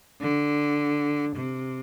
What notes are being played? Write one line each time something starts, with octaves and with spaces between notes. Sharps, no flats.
D3
C3